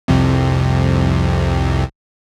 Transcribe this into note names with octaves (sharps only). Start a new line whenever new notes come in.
C2 F2 C3